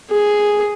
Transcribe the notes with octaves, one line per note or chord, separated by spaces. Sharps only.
G#4